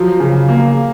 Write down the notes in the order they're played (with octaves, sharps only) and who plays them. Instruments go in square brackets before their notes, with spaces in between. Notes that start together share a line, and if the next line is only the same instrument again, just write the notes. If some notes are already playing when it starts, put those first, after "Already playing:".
Already playing: [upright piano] F3 [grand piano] F#3
[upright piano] C#3
A#3